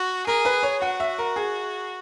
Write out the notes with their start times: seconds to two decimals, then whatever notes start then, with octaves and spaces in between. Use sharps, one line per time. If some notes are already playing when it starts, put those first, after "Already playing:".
Already playing: F#4
0.27 G#4 A#4
0.45 B4
0.63 C#5
0.82 F#4 F#5
1.00 E5
1.18 A#4
1.36 G#4